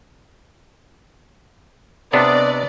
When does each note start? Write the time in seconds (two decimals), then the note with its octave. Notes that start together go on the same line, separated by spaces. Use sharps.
2.13 C3 B3 D4 D5 D#5